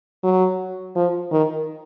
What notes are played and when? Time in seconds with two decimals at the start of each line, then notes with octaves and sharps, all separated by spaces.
0.24 F#3
0.95 F3
1.32 D#3